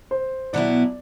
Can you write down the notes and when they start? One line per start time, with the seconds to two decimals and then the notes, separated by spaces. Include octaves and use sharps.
0.11 C5
0.53 B2 F#3 B3 E4 D5